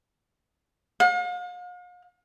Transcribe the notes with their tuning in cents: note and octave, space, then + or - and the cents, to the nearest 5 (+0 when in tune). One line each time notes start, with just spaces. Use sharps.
F5 +45